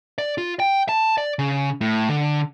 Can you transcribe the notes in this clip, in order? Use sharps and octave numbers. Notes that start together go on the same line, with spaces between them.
D5
F4
G5
A5
D5
C#3
A2
D3